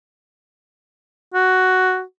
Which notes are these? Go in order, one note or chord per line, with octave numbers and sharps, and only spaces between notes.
F#4